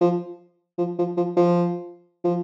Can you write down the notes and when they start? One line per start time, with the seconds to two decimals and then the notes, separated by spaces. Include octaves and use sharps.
0.01 F3
0.78 F3
0.99 F3
1.17 F3
1.37 F3
2.24 F3